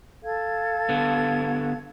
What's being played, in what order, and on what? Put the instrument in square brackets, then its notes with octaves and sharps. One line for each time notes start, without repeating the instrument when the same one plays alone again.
[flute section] A4 F5 G#6
[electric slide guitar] D3 B3